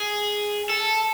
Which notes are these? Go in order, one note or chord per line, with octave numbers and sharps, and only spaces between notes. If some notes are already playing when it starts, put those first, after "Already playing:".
Already playing: G#4
A4